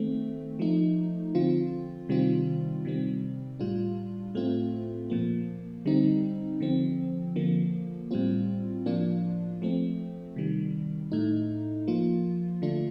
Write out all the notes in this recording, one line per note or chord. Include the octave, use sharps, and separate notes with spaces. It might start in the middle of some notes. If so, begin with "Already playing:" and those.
Already playing: D#3 A3 C4
F3 A3 D#4
D3 F3 C4 F4
C3 D#3 G3 C4 F4
C3 D#3 G3 C4
A2 G3 D4 F4
A2 A3 C4 F4
A#2 F3 A#3
D3 G3 C4 D#4
D3 F3 C4
D3 F3 A#3
A2 G3 C4 F4
A2 F3 A#3 D4 F4
F3 A3 C4
C3 D#3 G3
A2 A3 D#4
F3 A#3 F4
D3 A3 D4 F4